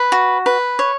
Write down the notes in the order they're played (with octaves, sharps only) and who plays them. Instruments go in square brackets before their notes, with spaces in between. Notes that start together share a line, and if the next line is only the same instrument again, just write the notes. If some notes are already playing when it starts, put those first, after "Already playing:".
Already playing: [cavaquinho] B4
F#4
B4
C#5